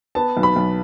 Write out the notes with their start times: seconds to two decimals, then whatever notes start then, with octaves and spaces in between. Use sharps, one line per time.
0.15 B3 A5
0.37 B1
0.43 B5
0.56 B1